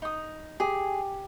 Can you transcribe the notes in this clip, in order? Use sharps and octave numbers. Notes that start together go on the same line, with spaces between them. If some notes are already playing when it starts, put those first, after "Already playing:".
D#4 D#6
G4 G#4 G#5